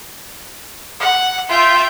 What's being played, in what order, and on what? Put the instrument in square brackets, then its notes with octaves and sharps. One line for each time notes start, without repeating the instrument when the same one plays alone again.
[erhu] F#5
[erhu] F4 [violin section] E5 G5 G6